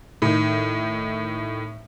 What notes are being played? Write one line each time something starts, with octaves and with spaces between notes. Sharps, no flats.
A2 D#3